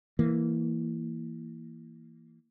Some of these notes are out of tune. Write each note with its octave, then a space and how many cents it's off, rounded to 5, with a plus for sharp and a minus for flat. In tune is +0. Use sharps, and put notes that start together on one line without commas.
E3 +0 A#3 -10